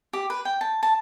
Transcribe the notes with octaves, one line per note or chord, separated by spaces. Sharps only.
G4
B4
G5
A5
A5